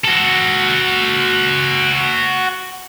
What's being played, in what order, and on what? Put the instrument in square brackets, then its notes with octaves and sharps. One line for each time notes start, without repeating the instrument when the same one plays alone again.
[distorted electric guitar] F#4 A4